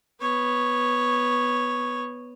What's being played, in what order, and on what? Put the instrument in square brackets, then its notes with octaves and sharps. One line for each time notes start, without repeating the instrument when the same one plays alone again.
[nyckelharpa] B3 C#5